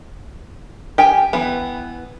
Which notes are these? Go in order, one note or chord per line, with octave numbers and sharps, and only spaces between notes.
G4 G5 G#5
E3 B3